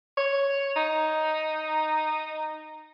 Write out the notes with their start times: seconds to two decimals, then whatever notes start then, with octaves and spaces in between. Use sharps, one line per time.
0.17 C#5
0.76 D#4